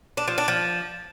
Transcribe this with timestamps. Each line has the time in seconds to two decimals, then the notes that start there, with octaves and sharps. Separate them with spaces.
0.17 D4
0.27 F3
0.38 D4
0.48 F3